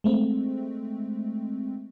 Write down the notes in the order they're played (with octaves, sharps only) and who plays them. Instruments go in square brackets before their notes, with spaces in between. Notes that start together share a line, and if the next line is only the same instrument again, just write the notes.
[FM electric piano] G#3 A3 C4